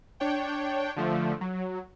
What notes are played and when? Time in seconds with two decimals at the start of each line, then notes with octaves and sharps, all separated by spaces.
0.20 D4 C#5 G5
0.96 D3 F3 A3
1.41 F#3